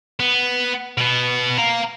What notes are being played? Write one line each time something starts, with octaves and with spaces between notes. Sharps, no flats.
B3
B2 B3
F5 A#5